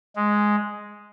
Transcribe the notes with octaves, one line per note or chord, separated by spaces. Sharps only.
G#3